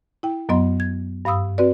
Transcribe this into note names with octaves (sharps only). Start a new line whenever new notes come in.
E4 G5
F#2 F#3 B3 D#5 C6
G#6
G2 F5 B5 D#6 E6
C4 F#4 B4 D5